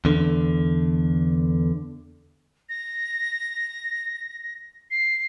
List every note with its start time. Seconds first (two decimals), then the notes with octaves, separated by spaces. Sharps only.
0.05 E2 D3
2.69 A#6
4.91 C7